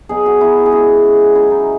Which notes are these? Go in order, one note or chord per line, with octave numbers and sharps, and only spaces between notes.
B2 F#3 G#4
F#4
B2 F#3 E4
G#4
C#3 G#3 F#4
C#3 G#3
C#3 F#3 E4
D#4